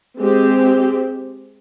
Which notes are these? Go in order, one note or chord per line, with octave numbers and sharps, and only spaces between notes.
G#3 C4 G4